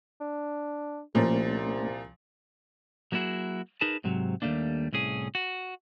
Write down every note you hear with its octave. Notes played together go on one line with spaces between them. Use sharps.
D4
C2 A#2 F3 A3 A#3 C#4
F#3 A#3 C#4 E4 F#4 G#4
D#4 G#4 A#4 B4 A5
G#2 C3 F#3
D#2 F#3 G3 A3 A#3 D4
C2 A2 C#4 G#4
F#4